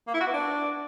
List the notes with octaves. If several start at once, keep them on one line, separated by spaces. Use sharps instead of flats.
A#3
E4
F#4
B3
D4